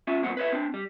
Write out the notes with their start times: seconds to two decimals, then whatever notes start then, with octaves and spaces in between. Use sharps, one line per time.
0.07 C#4 F4 E5 G#5
0.23 E2 G2 A#2 C4 F#5
0.37 B4 C#5 E5
0.52 C4 D4
0.74 G3